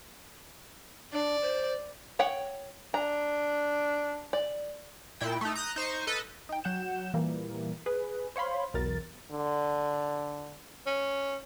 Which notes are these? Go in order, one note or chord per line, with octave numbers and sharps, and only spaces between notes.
D4 D5
C5
C#5 F#5 G5
D4 A#5
D5
A#2 E4 G5
A3 D#4
A#5 D#6 F#6 G6
D#4 C5 C#6
A4 B4 D#5
D#4 G5
F#3 F#5 G6 E7
A#2 E3 G3 A#3
G#4 B4
C5 C#5 F5 B5 C6
B1 E2 A#4 A6
D3
C#4